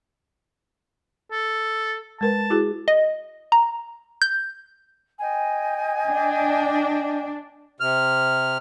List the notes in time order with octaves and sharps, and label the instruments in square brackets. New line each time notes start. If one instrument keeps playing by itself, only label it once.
[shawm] A4
[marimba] G#3 A#4 B4 [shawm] A5
[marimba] E4 F#4 G#4
[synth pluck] D#5
A#5
G6
[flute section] D#5 G5 G#5
[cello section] D4
[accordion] C3 F6